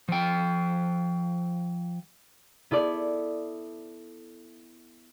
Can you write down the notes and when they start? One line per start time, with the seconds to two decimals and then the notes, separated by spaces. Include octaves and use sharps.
0.09 F3 G5
2.71 B3 E4 A4 D5